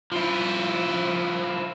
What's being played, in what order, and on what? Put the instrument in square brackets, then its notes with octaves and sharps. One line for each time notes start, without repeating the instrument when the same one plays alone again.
[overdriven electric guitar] F3 E4